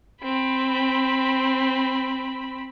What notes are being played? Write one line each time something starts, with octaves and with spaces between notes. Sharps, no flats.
C4 B5